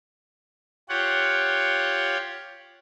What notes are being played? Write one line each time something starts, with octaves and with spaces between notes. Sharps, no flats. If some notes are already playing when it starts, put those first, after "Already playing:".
F4 G4 C#5 F#5